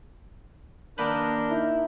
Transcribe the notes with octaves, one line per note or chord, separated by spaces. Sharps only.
D#3 A#3 D4 A#4 B4 G6
D#4 E4